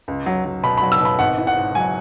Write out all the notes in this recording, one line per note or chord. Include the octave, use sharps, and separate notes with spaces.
C#2
F#3
F#3
B2 B5
B5
F#3
E6
B2 B5
G#1 F#5
E4
F#5
G#2
F#3 G#5